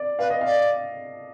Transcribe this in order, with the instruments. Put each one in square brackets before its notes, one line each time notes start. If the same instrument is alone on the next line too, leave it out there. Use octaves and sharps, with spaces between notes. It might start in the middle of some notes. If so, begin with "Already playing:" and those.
Already playing: [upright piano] D5
[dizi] B4 [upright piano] F5
[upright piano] D#5
[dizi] D5 [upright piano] F5